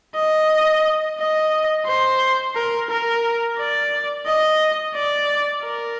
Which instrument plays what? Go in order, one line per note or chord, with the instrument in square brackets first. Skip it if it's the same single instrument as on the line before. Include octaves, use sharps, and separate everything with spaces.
[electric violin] D#5
D#5
C5
A#4
A#4
D5
D#5
D5
A#4